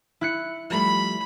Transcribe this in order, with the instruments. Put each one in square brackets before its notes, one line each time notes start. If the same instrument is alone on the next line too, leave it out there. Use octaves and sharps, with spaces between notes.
[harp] E4 F#6 C#7
[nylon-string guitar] F3 G3 A3 [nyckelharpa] B5